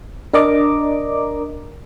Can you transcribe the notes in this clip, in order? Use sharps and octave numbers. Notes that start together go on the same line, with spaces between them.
D4 A#4 D5 D#5 A#5 D6